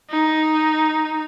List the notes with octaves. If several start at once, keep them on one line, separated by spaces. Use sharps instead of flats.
D#4